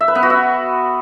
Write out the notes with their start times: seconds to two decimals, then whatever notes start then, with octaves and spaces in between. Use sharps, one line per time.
0.01 E5
0.08 B4
0.15 B3
0.23 F#4
0.30 E5